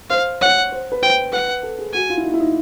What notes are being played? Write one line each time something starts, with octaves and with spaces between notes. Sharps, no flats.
C5 F5
C#5 F#5
C5
B4
C5 G5
B4 F#5
A4
G#4
F#4 G#5
F4
E4
D#4
E4
D#4